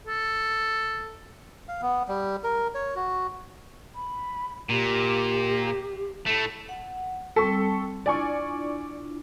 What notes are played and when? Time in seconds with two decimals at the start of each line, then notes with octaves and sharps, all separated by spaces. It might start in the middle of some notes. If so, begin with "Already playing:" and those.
0.07 A4
1.68 F5
1.82 B3
2.08 G3
2.44 A#4
2.74 C#5
2.95 F#4
3.95 B5
4.70 A#2 G4
6.27 A2 A3 A4
6.69 F#5
7.36 G3 C4 A4 C#6
8.06 D4 E4 F4 D5 G#5 C#6